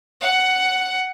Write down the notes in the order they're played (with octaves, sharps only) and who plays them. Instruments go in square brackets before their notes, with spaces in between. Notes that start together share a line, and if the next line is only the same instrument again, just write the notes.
[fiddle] F#5